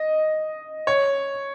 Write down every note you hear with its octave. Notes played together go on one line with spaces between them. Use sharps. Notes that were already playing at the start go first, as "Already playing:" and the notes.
Already playing: D#5
C#5